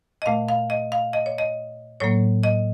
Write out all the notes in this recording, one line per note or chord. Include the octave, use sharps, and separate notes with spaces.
D#5
A#2 A3 F5
F5
D#5
F5
D#5
C#5
D#5
A2 F#3 A#3 C#5
D#5